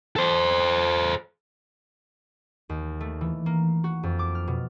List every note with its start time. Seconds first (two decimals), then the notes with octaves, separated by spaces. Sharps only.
0.16 A4 C5
2.69 D#2
3.00 A3
3.21 E3
3.46 A#3
3.84 F#4
4.03 F2
4.19 D6
4.35 F6
4.48 B2